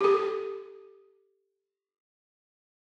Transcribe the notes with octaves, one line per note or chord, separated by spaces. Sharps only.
G4 A4